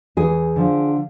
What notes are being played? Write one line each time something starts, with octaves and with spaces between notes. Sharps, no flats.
E2 G#4
D3 F3